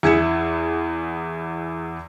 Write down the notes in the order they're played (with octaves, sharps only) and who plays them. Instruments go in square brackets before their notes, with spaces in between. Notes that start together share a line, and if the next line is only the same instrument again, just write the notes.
[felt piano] E2 E4 G#4 G#6 C#7 E7